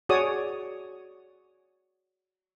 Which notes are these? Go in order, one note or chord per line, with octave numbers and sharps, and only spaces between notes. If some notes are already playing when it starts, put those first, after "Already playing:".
F#4 G#4 C#5 D5 D#6